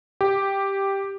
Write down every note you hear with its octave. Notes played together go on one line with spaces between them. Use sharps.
G4